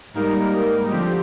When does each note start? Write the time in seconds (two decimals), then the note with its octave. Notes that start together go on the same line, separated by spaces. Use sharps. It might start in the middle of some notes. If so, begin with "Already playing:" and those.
0.14 G#2 G3 A#3 D#4 A#4
0.90 D3 F3 C4 G4